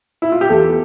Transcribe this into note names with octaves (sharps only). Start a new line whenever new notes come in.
E4
F4
G4
E2 A4